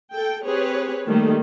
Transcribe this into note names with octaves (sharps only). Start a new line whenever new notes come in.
A4 G5
C4 G4 G#4 B4 C#5
D#3 G3 A3 A#3